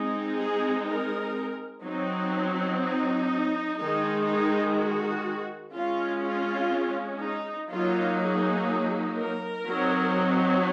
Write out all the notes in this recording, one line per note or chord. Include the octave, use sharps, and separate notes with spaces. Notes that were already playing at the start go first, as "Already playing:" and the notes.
Already playing: G#3 C4 D#4
G#4
A#4
F#3 C4 D#4
D#4
D#3 G#3 D#4
D#4
F#4
G#3 C#4 F4
F4
D#4
F#3 A#3 D#4 F4
G#4
A#4
F#3 C4 D#4